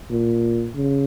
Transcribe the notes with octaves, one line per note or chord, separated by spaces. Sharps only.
A#2
C#3